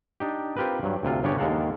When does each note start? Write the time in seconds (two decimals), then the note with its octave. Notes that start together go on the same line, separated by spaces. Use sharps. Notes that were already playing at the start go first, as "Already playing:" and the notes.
0.20 D4 D#4 G4
0.57 C4 F4 G4 A#4 B4
0.83 G2 F#3
1.03 D2 C3 F4
1.23 G1 C#3 C#4 D4 G4 C#5
1.38 D#2 G#3 A4 A#4 F5 F#5